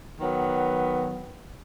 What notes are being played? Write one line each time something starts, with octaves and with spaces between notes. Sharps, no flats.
D#3 F#3 B3